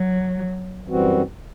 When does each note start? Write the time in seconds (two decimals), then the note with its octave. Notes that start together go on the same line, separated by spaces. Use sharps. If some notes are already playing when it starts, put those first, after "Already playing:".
Already playing: F#3
0.87 F#2 E3 G3 C4 F#4